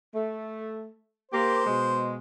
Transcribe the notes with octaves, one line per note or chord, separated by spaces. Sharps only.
A3
A#3 G4 C5
B2 G#3